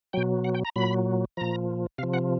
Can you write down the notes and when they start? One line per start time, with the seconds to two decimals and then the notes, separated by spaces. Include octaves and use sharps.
0.13 B2 F#3 G5
0.44 F#5
0.55 G5
0.65 A#5
0.76 A#2 F#3 B5
1.37 A#2 F3 A#5
1.98 C3 F5
2.03 F3
2.14 F#5